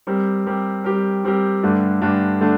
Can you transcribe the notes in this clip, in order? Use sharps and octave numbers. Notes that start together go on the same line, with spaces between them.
G3 C4 G4 A#4
G3 C4 G4 A#4
G3 C4 G4 A#4
G3 C4 G4 A#4
G2 D3 A3 D4
G2 D3 A3 D4
D3 A3 D4